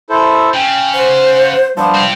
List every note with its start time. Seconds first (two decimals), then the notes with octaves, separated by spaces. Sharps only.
0.09 E4 A4 C5
0.54 C#3 G5
0.94 C5 F#5
1.77 F3 G3 B3 D4 C5 A5
1.95 C4 G4